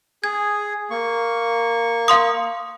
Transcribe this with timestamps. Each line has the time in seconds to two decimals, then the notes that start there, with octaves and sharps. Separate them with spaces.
0.24 G#4 G#6
0.90 A#3 C#6
2.08 F5 C6 D#6